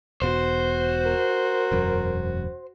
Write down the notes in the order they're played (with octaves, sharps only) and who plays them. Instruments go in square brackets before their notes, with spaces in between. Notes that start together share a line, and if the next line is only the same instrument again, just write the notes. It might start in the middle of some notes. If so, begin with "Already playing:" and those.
[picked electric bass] E1 B2 [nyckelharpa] F#4 [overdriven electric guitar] C5
[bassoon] A#4
[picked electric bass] E1 F#2